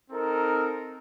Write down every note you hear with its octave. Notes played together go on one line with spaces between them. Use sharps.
C4 D#4 A4 A#4